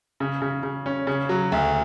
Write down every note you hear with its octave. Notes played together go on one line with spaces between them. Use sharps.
C#3
C#3
C#3
C#4
C#3
F#3
D2